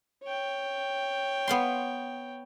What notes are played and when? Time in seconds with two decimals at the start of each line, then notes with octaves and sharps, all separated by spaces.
0.23 C#5 G5
1.47 B3 F5 C6